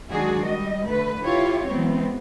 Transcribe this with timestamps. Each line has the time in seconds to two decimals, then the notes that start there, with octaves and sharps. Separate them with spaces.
0.11 D#3 F#3 G#3 D4 F#4 G#4
0.46 G3 D#5
0.87 D3 A3 B4
1.23 E4 F4 G4 C#5
1.67 E3 F#3 G#3 B3 C4